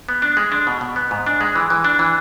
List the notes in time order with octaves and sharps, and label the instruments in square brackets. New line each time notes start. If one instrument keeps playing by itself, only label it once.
[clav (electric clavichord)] B3
D4
G#3
D4
B2
B2
B3
G#2
D4
G#3
E3
E3
D4
E3